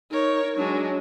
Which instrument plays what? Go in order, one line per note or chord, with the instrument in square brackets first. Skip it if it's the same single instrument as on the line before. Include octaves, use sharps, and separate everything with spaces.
[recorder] D#4 [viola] A#4 C#5
[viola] F#3 G#3 [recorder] D4